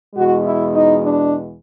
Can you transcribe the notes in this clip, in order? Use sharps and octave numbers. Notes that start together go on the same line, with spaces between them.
E2 B2 G#3 F#4
E4
D#4
D4